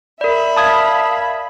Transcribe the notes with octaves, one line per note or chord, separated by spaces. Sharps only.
A#4 D5 E5 B5
F5 A5 D#6 G#6